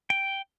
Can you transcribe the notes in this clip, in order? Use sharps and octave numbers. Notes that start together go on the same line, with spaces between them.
G5